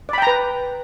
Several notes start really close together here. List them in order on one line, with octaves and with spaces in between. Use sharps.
D5 B5 G5 A#5 B4